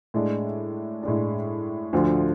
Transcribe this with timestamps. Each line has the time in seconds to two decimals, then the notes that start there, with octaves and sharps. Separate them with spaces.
0.14 A2 G#3 D4
1.03 A2 G#3 D4
1.93 D2 D3 F3